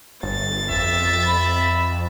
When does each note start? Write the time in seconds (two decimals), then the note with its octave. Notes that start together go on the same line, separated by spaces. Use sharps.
0.23 G1 A6
0.70 F2 E5
1.27 B5